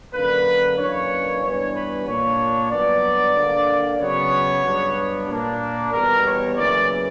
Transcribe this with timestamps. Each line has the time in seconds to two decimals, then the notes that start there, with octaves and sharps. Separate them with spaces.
0.14 F#2 D3 A#3 D4 B4
0.78 F#2 E3 A#3 D4 C#5
1.42 G2 E3 B3 D4 C#5
1.75 B4
2.07 A#2 A#3 D4 C#5
2.71 G2 F#3 B3 D4 D5
3.35 D3 A#3 D4
4.00 C#3 F#3 B3 C#5
4.64 G2 F#3 B3 D4
5.28 A#2 A#3 D4
5.93 E2 B2 G3 B3 A#4
6.25 C#5
6.57 F#2 C#3 E3 A#3 D5